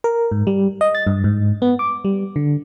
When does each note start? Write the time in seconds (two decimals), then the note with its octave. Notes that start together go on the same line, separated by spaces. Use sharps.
0.04 A#4
0.32 G#2
0.47 G3
0.81 D#5
0.95 A6
1.07 G2
1.24 G#2
1.62 B3
1.79 D6
2.05 G3
2.36 D3